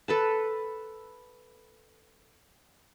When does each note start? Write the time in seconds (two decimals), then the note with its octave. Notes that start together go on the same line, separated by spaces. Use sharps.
0.08 A4 B4 A5